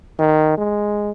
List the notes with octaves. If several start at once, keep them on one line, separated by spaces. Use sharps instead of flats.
D#3
G#3